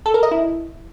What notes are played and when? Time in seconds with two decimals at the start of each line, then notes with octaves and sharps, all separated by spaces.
0.06 A4
0.14 A#4
0.23 D#5
0.31 E4